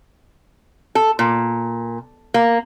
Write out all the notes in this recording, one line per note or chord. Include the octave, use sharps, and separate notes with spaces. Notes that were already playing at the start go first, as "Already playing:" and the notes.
A4
A#2
A#3